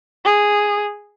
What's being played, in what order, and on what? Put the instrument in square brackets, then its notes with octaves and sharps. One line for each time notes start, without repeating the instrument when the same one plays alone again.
[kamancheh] G#4